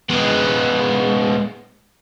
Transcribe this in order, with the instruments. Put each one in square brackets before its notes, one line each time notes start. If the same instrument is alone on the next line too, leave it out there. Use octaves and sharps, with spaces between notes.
[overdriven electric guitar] G#3 B3